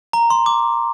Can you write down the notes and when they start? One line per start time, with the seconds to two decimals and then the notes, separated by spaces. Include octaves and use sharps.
0.13 A#5
0.30 C6
0.46 D6